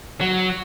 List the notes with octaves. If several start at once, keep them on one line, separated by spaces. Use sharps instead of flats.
F#3